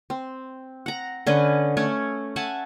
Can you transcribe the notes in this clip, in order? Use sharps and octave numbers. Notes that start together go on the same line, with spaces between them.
C4
F#5 A#5
D3 C#4 B4 D#5
A3 C#4 C#5
E5 F#5 G#5 A5